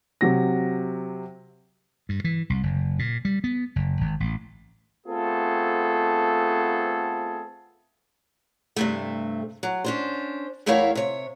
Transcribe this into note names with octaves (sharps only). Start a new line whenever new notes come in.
C3 F#3 A#6
G2
E3
C2
F#1
A#2
G3
B3
F#1
G#1
A1
A3 B3 C4 F4 G#4 A4
G2 C3 A3
F#3
C#4 D4 C5
E2 A3 E4 A#4 C#5 F5
C3 C#5